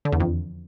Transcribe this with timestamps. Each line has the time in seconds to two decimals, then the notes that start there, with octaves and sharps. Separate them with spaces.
0.05 D3
0.12 E2
0.20 F2